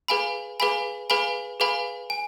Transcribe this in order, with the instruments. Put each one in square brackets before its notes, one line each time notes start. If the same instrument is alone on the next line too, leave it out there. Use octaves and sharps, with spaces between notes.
[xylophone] G#4 B4 F5 G#5 B5
G#4 B4 F5 G#5 B5
G#4 B4 F5 G#5 B5
G#4 B4 F5 G#5 B5
G#5